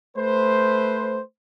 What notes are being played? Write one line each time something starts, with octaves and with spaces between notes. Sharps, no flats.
A3 B4 C5